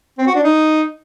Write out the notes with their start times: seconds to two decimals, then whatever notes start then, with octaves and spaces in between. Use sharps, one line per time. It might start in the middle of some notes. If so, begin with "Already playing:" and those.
0.18 C4
0.27 F#4
0.35 D4
0.44 D#4